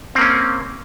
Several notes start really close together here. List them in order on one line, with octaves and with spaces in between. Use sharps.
C4 A#3 C#4